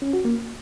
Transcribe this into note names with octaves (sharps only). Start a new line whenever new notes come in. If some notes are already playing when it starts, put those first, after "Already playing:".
C#4
F#4
A#3